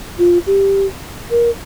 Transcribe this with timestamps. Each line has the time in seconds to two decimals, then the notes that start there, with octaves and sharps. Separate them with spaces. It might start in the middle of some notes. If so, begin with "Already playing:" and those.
0.19 F4
0.47 G4
1.31 A#4